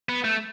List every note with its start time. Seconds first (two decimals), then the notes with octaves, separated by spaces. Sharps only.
0.09 B3
0.24 A3